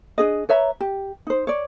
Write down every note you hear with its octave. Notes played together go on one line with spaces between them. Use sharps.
D4 G#4 D#5
B4 C#5 E5 A#5
G4
D#4 C5
C#5 D5